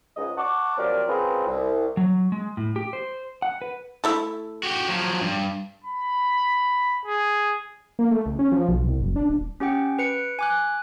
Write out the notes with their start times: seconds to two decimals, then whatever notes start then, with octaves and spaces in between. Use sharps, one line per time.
0.16 C#2 G#2 D#5
0.37 F#5 A5 C#6 D6
0.78 F3 F#3 C4 G4 A#4 D5
1.08 C4 C#4 F4 G#4 A#4 B4
1.47 C2
1.97 F#3
2.32 G#3
2.57 A2
2.76 G4
2.93 C5
3.42 F#5
3.62 B4
4.04 A3 E4 A4
4.63 F#4 G4
4.88 F3 F#3
5.20 G2
5.84 B5
7.05 G#4
7.99 A#3
8.11 A3
8.26 C#2
8.39 C#4
8.52 F3
8.69 B1
8.86 C2
9.00 F#1
9.16 D4
9.29 D#1
9.60 C#4 G4 F#5 G5
9.99 B4 C#7 D7
10.39 G#5 D6 F#6